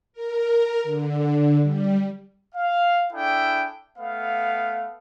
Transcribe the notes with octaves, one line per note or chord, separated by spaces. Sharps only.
A#4
D3
G3
F5
D4 E4 G#4 A4 G5
A3 B3 F5